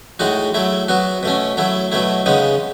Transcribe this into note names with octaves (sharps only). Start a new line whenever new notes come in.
A2 G#3 D#4 F#4
F#3 A3 E4
F#3 B3 F#4
B2 A3 C#4
F#3 A3 E4
B2 F#3 A3 E4
C#3 G#3 B3 D#4